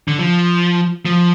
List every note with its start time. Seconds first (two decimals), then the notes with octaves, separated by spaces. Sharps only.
0.08 D3
0.19 F3
1.06 F3